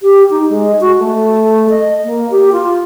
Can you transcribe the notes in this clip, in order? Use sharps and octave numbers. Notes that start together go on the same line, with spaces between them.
G4
D#4
G#3
F#4
A3
D#5
A#3
G4
F4